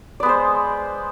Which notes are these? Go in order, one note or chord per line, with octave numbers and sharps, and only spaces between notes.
G#3 B3 C5 D5